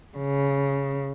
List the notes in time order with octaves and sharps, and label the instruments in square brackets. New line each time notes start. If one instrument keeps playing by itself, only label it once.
[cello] C#3